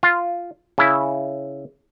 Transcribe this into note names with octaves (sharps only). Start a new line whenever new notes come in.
F4
C#3 E4